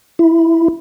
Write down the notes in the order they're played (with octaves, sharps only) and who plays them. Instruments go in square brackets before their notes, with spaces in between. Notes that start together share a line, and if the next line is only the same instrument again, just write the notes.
[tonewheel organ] E4